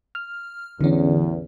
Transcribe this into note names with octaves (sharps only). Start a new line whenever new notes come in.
F6
A1 E2 D3 E3 C#4